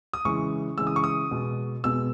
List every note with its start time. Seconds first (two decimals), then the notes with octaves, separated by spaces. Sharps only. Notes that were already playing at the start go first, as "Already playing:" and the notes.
0.13 D#6
0.25 C#3 E3 G#3 C#6
0.78 C#3 E3 G#3 E6
0.87 D#6
0.96 C#6
1.04 D#6
1.31 B2 G#3 B3
1.84 B2 G#3 B3 E6